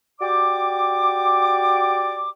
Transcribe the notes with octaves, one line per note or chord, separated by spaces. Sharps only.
F#4 G4 D5 G5 D6